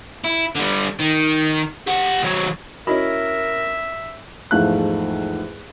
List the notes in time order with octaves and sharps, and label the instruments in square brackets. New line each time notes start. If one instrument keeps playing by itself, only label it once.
[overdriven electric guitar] E4
D3 G3
D#3
G4 F#5
D#3 F#3
[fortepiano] C#4 E4 B5 [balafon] F#4 D#5 [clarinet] A#4 [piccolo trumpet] E5
[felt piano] E2 G#2 F3 A3 F5 F#6